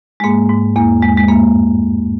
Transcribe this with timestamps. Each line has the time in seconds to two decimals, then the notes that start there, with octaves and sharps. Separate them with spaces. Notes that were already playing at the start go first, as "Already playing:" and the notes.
0.20 G#3
0.24 G#2 A#3
0.49 G#2
0.76 E2 A#3
1.03 E2 G#3
1.17 G#3
1.28 G2 A#3